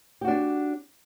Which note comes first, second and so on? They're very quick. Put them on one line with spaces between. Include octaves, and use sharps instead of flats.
G4 F#4 D4 D5